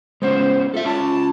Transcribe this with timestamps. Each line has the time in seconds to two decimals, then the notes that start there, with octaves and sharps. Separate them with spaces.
0.22 G#3 B3 C#4 C5
0.74 F4 A4 E5
0.85 C#4 F4 A5